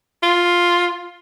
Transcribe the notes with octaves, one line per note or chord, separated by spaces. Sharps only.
F4